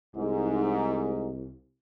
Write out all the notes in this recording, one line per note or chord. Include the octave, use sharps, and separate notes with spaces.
C2 G#2